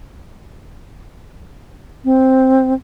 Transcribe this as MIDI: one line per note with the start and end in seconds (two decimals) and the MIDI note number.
2.05 2.73 60